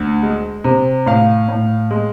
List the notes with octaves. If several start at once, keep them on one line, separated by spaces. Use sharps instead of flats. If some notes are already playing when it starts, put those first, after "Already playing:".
Already playing: D2
G#3
C3
A2 F5
A2
G#3